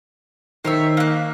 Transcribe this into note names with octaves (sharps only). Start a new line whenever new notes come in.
D#3 C5 C#5 E5
A#3 F#6